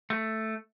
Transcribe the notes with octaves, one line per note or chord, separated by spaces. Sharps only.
A3